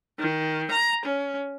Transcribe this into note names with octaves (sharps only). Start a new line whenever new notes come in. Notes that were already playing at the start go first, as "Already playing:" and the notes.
D#3
A#5
C#4